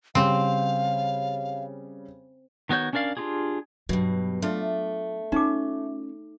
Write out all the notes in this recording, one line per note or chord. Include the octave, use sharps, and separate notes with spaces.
C#3 G3 C4 F5
D#3 B3 F#4 C#5 G6
C#4 D4 A#4 D5 F5
D4 D#4 F4 G4 G#4
G2 B2 F#3
A3 D4 F4
C#4 D#4 F4 D6